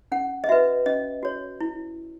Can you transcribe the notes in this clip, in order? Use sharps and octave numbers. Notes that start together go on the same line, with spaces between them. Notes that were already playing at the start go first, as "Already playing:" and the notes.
C#4 F#5
D#5
F#4 B4 E5
C#4 D#5
F#4 C#5
E4